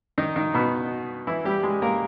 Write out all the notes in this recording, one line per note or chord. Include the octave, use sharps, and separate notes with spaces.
D#3 D#4
D#3 D#4
B2 B3
E3 E4
G3 G4
G#3 G#4
A#3 A#4